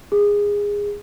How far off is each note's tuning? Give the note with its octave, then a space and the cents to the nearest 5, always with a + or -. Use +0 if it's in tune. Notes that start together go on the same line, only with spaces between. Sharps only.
G#4 -20